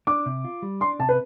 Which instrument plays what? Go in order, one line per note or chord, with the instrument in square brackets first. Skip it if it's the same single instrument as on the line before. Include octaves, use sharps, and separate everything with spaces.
[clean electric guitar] D4 [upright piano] D6
[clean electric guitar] C3
F4
G3
[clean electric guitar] D4 [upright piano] C6
[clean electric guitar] C3 [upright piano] A5
[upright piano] B4